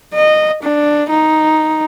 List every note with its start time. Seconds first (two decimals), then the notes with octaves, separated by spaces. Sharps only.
0.14 D#5
0.63 D4
1.10 D#4